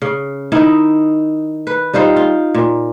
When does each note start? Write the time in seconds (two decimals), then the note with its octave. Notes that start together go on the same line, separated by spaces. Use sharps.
0.02 C#3
0.52 D#3 D#4 E4
1.67 B4
1.93 G3 D#4 F4 C5
2.16 F4
2.55 A#2